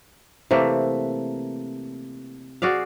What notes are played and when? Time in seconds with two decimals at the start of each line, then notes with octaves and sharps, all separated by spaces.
0.51 C3 E3 A3 A#3
2.62 F#4 G#4 D5 F5